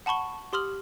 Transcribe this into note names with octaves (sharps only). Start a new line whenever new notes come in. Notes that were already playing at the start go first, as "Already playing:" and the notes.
F#5 A5 B5 C#6 G7
G4 C6 D#6 F6 F#7